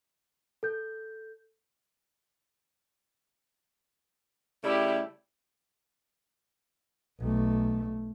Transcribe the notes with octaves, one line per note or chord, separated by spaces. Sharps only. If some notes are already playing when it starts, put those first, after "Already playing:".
A4 G6
C#3 G3 A3 E4 G4
B1 A3